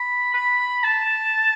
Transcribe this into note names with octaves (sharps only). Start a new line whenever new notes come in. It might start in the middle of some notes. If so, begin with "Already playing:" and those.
Already playing: B5
B5
A5